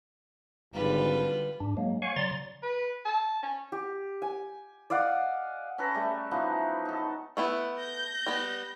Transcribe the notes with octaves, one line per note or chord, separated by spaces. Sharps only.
G#1 D3 G3 F4 B4
G#2 D4
F#3 G#3 A#3
C#5 F5 F#5 G#5 C#6
C#3 F#3 D5 A#5 C6 A6
B4
A5
C#4
G4
G#5
D5 D#5 F5 F#5
C#4 A4 B4 A#5
G3 A3
E3 F3 B3 D#4
D#4 A4
A3 B3 E4 F#5
G6 A#6
G3 B3